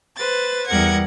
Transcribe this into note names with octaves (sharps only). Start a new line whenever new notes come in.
B4 C5 A6
E2 G3 A#4 F#5 G#6